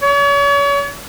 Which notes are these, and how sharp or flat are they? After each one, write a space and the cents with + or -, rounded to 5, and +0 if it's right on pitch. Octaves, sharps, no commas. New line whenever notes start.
C#5 +40